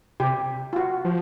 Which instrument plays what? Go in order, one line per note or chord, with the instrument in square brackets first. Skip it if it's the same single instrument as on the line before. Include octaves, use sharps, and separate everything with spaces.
[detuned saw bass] C3 [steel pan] G4
[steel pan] F4
F#4
[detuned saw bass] F3